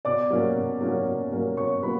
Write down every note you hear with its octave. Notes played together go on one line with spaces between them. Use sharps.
B2 D5 D6
F#3 A#3 C#4
B2
F#3 A#3 C#4
B2
F#3 A#3 C#4
B2 C#5 C#6
F#3 A#3 B4 B5